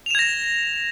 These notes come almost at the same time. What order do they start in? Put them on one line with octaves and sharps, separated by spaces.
F7 E7 G#6 A#6